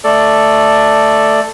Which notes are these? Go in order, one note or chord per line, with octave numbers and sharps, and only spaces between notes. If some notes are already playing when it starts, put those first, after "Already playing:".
A3 A4 D5